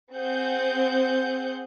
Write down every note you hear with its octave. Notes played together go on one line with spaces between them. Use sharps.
C4 G#4 F#5 G6